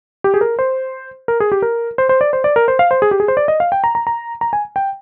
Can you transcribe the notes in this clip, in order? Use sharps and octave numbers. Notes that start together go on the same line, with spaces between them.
G4
G#4
A#4
C5
A#4
G#4
G4
A#4
C5
C5
D5
C5
D5
A#4
C5
F5
C5
G#4
G4
G#4
C5
D5
D#5
F5
G5
A#5
A#5
A#5
A#5
G#5
G5